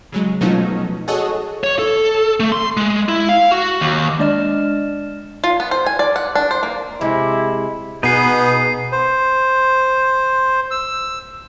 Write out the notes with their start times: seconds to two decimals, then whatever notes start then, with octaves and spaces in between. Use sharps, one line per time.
0.12 C#3 F#3 G#3
0.41 B2 F3 F#3 A3 C#4 D#4
1.08 F#4 G#4 A4 C#5 D#5
1.64 C#5
1.79 A4
2.40 A3
2.52 C6
2.77 G#3
3.09 E4
3.29 F5
3.52 F#4
3.81 D#2
4.19 G#3 D4 D5 D#5 F6 E7
5.44 F4
5.60 B3
5.71 C5
5.86 G#5
5.99 D5
6.16 F#5
6.35 D4
6.51 C5
6.63 A#3
7.01 C3 G#3 E4
8.03 B2 B3 D#4 G#4 B4 C7 D#7
8.92 C5
10.71 E6